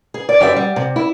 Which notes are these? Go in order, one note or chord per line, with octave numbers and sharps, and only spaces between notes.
G#4
D5
F#2 G4 D5 E5
G3
C3
E4